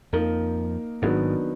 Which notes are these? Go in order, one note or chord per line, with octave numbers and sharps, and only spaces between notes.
F2 F3 A#3 D#4 A#4
G#1 G#2 D#3 F#3 B3 D4